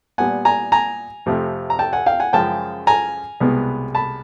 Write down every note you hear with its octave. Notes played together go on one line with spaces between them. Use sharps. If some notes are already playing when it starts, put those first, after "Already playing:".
A#2 G3 B3 F#5 G#5
G#5 A#5
G#5 A#5
F2 C3 F3 A3
A#5
G5 A5
F#5 G#5
F5 G5
F#5 G#5
F#2 C#3 F3 G#3 G5 A5
G#5 A#5
C2 B2 G#3 B3
A5 B5